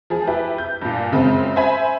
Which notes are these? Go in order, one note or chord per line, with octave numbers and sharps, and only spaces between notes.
F3 G#4
E4 G4 B4
G6
G2 A#2
F#2 C#3 G#3 C4
C5 E5 G#5 B5